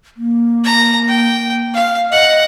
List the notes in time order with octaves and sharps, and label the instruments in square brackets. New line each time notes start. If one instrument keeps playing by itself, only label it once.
[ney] A#3
[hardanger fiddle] A#5
G5
F5
[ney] D#5 [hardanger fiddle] F#5